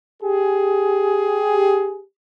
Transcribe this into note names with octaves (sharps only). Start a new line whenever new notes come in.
G4 G#4